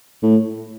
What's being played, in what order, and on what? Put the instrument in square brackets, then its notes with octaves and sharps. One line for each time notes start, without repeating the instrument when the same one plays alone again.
[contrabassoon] A2